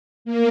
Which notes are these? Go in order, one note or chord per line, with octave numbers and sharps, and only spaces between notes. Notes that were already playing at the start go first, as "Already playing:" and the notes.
A#3